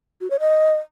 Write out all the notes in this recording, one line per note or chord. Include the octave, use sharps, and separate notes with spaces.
F#4
C#5
D#5